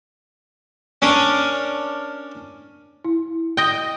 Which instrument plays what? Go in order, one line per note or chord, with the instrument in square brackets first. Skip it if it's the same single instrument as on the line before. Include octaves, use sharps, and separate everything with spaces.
[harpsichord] C#4 D4 A#4
[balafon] E4
[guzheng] D#5 G5